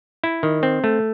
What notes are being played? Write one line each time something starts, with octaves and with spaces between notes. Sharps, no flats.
E4
D#3
C4
A3